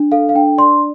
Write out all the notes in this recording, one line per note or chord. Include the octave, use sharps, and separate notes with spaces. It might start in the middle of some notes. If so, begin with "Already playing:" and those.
Already playing: D4
A4 F5
F5
D4 G5
D5 C6